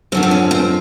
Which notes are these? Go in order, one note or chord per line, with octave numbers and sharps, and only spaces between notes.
F#2 D3 F3 C4
C4
C#4
C4